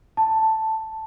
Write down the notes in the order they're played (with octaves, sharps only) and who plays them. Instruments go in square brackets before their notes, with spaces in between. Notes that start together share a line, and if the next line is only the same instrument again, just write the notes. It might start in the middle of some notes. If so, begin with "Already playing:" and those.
[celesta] A5